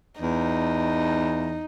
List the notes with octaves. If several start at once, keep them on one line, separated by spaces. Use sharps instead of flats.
E2 D#4